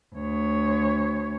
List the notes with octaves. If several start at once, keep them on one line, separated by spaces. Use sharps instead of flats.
D2 C#5